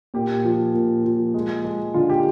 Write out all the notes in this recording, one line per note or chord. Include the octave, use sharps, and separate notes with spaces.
A#2 G4
F3
A#2
F3
G#3
G#3
D3 F4
G4